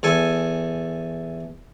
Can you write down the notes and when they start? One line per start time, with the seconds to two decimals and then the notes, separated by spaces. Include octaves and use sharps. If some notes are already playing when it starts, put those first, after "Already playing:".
0.03 E2 A4 G#5